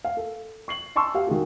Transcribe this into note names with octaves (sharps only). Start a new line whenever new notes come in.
F5
A4
C#6 C7 F#7
G#5 A5 C6 C#6 E6
G4 F5
D#3 G#3 F#4